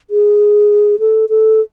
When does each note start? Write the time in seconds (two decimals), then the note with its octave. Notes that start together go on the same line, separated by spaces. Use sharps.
0.10 G#4
1.00 A4
1.29 A4